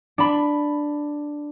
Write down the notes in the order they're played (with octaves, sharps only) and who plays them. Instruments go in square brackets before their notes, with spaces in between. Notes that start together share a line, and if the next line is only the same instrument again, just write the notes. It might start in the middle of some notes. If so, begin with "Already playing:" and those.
[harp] D4 B5